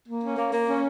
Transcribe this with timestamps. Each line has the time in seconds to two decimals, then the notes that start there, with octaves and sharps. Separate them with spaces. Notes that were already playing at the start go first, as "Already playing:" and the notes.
0.08 A#3
0.23 C#4
0.37 A#3
0.53 A#3
0.68 C#4